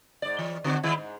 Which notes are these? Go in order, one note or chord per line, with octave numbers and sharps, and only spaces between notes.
G#2 D5
E3
D3 C4 F#4
D#3 G#3 E4
G#2